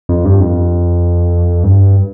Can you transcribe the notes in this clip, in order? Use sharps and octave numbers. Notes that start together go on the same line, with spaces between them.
F2
G2
F2
G2